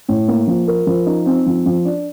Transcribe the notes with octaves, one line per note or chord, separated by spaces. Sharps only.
A2
A#3
F3
A#4
F3
D#4
C4
F3
F3
D4